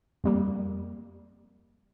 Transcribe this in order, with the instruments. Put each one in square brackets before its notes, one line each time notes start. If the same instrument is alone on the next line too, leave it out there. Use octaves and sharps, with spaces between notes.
[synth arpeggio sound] F2 G3 A#3